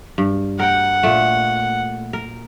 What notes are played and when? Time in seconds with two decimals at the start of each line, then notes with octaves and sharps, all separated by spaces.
0.18 G2
0.59 A#4 F#5 G5
1.03 A#2 A3
2.13 A#4